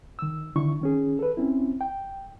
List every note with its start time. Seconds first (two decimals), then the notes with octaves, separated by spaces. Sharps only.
0.19 D#3 E6
0.56 D3 D#3 D4 E4 C#6
0.81 D#3 C#4 G#4
1.19 A4 B4
1.37 C4 C#4 E4
1.81 G5